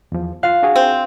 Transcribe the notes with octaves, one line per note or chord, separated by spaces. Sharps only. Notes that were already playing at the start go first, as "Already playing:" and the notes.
E2 F3
F4 F5 F#6
D4 F#4 G#4
C4